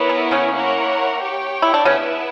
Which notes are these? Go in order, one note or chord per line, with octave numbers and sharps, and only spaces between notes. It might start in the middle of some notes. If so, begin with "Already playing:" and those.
Already playing: B3 E4 A#4 C#5
E3
C#3 C#4
A#3 E4 A#4 C#5 F#5
G4 C#5 G5
E4
D4
C#3 B3 C#4 E4 B4 E5